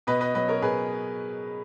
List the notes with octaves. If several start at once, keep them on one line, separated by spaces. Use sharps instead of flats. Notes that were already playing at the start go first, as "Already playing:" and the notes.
B2 B4 D#5
B4 D#5
F#3 B4 D#5
A#4 C#5
B2 G#4 B4